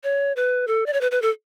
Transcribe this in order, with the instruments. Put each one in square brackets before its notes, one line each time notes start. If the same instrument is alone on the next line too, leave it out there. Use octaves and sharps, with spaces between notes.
[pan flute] C#5
B4
A4
D5
C#5
B4
B4
A4